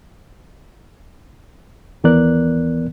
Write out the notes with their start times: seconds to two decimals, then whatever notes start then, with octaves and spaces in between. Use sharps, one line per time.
2.04 D#2 E3 B3 A#4 D5 F#6